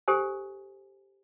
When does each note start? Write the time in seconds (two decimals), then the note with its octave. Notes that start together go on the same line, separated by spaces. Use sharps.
0.08 G4 A4 C5 G#5